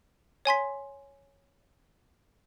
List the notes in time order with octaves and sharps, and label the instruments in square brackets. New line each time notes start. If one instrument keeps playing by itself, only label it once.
[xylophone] C#5 G#5 C6 B6